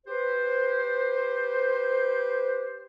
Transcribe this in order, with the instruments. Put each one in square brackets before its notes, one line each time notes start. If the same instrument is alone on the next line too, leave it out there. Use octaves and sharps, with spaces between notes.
[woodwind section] G4 B4 C5